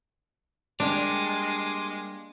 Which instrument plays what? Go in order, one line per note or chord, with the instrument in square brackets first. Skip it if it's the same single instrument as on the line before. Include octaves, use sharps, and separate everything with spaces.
[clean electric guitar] G3 A#3 G4 [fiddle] G#3 [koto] D4 [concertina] C6 D6